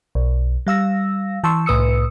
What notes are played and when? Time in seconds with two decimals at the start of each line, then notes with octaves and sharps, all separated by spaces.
0.15 B1
0.67 G3 F5 E6 A#6
1.44 E3 A5 C6 C#6 E6
1.66 C2 A2 B4 D#6 E6 C#7